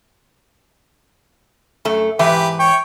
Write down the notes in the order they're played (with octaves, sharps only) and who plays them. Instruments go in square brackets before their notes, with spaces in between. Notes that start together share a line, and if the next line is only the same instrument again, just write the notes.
[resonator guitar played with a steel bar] F#2 A3
[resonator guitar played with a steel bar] G#2 E3 E5 [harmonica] G4 B4
[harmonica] C#5 G5 C#6